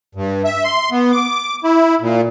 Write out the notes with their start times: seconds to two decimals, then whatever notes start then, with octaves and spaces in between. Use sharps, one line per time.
0.15 G2
0.44 E5
0.64 C6
0.92 B3
1.12 D6
1.64 E4
2.01 A#2